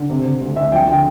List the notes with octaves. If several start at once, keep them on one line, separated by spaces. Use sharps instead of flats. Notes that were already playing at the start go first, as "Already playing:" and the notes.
Already playing: D3
C3
C3
D2
D2 E5
F2 G5
D3 G5